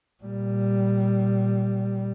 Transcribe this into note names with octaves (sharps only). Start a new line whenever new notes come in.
A#2 G3